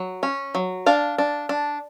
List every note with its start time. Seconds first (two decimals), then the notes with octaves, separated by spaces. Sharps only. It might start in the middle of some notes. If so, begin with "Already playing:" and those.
Already playing: F#3
0.23 C#4
0.55 F#3
0.86 D4 F5
1.18 D4
1.49 D4